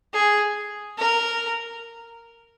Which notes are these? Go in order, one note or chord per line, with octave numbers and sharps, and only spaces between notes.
G#4
A#4